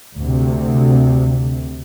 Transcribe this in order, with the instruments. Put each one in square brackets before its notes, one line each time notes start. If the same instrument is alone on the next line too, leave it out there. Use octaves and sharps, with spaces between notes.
[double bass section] D2 C3